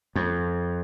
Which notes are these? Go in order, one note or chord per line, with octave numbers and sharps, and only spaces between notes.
F2